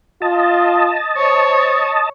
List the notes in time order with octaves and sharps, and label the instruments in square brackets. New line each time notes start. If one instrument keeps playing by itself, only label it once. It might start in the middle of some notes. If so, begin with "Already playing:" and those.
[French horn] F4 [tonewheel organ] D#5 A5
[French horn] C5 [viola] C#5